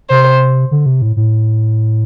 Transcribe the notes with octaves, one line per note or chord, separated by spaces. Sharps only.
C3 C5
D3
C3
A2
A2